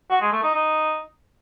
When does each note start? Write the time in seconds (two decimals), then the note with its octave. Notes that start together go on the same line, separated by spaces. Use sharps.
0.10 F#4
0.21 G#3
0.32 A3
0.43 D#4
0.54 D#4